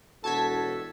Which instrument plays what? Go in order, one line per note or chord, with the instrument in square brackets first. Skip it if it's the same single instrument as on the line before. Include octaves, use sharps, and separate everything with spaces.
[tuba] E1 [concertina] F#4 [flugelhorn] A4 [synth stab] A5 G#6 B6